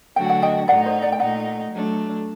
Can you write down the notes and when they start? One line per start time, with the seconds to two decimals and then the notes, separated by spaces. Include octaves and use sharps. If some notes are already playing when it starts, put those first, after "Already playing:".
0.16 D3 F#3 A3 D4 F#4 G5
0.30 F#5
0.42 D#5 G5
0.68 A2 A3 D#4 D5 F#5
0.85 C5 D#5
1.02 D5 F#5
1.12 G5
1.20 A#2 A3 D#4 D5 F#5
1.71 F#3 A3 D4